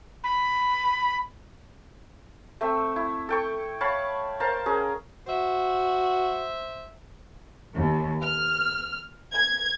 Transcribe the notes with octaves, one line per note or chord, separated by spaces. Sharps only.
B5
A3 C4 E5
E4
A4 G5 C#6
C#5 F5 A5 B5
A#4 C5 F5 A5
C#4 G#4 A#4
F#4 C5 E5
D#2
F6
G#6